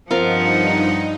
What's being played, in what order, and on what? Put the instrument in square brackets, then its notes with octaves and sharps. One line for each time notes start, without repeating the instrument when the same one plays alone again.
[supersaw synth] G2 D#4 [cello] F3 F#5 [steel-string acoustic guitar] C4 F4 A#4